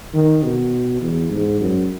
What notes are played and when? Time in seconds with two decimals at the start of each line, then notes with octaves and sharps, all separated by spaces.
0.14 D#3
0.43 B2
1.01 E2
1.30 G#2
1.61 F#2